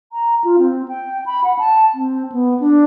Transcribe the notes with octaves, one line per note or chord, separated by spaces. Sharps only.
A#5
F4
C4
G5
B5
F#5
A5
C4
B3
D4